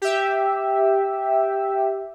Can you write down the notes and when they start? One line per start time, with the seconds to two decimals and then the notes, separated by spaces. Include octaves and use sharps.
0.02 G4 E5